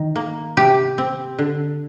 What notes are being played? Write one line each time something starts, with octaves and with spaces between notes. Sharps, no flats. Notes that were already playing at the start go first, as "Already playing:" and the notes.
Already playing: D#3
A#3
C3 G4
C4
D3